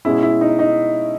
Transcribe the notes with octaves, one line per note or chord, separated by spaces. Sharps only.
B2 G#3 C#4 E4
E4
D#4
D#4